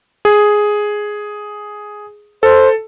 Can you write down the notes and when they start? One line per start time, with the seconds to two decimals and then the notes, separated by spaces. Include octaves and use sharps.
0.25 G#4
2.43 A4 C5